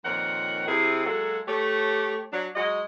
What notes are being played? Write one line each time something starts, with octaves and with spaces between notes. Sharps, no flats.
F2 A#2 D#3 A#4 C#5 F#5
C3 E4 G#4
F#3 G#3 A#3 F#4 G#4 A4
A3 G4 C#5
F#3 D4
F#3 G#3 F#4 D#5